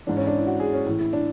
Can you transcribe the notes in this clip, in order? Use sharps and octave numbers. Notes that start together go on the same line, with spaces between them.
G#2 E3 D4
C#4
D4
E4
F#4
G#4
C#4
A2 E3
E4
D4